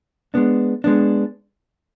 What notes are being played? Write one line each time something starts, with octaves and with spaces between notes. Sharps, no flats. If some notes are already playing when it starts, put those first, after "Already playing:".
G#3 B3 D4
G#3 B3 D4